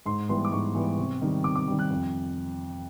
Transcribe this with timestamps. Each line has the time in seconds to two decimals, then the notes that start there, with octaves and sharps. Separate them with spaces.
0.06 G#2 C6
0.29 E3 G3 B3 C6
0.45 D6
0.52 G#2 C#6
0.75 E3 G3 B3
0.97 C3
1.21 D#3 G3
1.44 C3 D6
1.56 D6
1.68 D#3 G3
1.79 F#6
1.90 F2